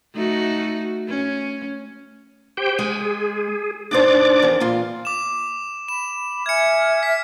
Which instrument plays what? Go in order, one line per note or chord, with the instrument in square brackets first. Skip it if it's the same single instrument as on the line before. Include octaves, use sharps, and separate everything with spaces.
[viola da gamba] A3 D#4 F#4
C#4
[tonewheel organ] G4 C5 G5
[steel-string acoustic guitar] G#3 [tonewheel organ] G#5
[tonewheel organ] G#4
[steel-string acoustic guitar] A2 D#4 C5 [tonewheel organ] D4 D5 D6
[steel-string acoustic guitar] E2 A#4 C5
A#2 F4
[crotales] D6 E7
[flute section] B5 [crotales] E7
[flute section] E5 G#5 F6 [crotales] G#6 C#7
[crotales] B6